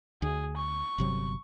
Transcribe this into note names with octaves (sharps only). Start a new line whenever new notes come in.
D2 G#4
C#6
G1 C3 F#3